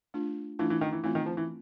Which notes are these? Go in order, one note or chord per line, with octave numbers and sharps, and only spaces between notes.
A3 D4 F4
E3 A3 D4 F4
E3
D#3
E3
E3 A3 C4 F4
D#3
F3
E3